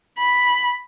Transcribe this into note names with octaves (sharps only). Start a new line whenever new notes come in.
B5